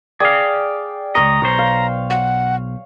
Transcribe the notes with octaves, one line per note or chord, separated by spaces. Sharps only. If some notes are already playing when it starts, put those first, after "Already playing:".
G#4 D5 F5 G5
C#2 A#2 D#5 A#5 C#6
B1 C5 C#5
F5
F#5